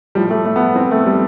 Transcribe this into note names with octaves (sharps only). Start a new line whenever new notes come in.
A2 F3 G3
A3
A3
B3
C4
A3
G3